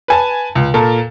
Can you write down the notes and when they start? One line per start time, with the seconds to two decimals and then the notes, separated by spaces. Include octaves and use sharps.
0.08 B4 G#5 A5
0.55 C#2
0.74 A#2 A4 A#4